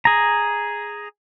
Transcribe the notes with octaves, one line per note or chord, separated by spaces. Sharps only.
G#4 A#5